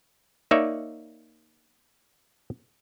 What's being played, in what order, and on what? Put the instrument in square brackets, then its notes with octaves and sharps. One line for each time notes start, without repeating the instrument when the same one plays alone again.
[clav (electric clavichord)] A#3 D#4 C#5 D5 E5